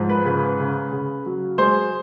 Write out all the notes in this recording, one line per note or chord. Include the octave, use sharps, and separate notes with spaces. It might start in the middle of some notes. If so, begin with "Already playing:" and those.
Already playing: G#2 F3
B4
C#3 B4
C#3
C#3
F#3
G#3 C5